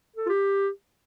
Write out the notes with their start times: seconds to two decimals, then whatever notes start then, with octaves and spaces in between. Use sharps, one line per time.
0.17 A4
0.26 F4
0.30 G4